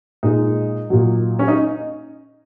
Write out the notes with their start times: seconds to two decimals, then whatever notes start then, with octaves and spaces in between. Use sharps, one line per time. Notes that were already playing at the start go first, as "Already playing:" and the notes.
0.23 A#2 G#3 D#4
0.90 A#2 F#3
1.39 C#4
1.48 D#4